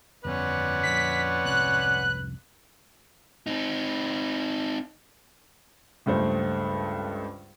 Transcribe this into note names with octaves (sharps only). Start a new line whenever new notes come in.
G1 F2 B3 C#4 B4 D5 F#5
F2 A#2 D3 B6
C2 F2 G#2 F#6
C4 D#4
C#2 G2 A3 C5